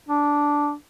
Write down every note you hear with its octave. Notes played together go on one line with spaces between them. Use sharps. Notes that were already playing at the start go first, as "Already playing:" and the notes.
D4